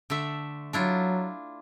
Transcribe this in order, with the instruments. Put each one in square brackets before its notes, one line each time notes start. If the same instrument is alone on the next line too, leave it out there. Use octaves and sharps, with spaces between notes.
[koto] D3 A3 E5
[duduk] F#3 [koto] D4 E4 F4